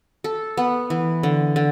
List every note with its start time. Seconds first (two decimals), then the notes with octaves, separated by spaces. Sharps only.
0.24 A4
0.57 B3
0.90 E3
1.23 D3
1.56 D3